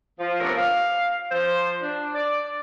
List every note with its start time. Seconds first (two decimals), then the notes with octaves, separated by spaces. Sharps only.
0.20 F3
0.40 C3 A3 B3 C#4 D4 A#4
0.58 F5
1.32 F3 C5
1.82 D4
2.15 D5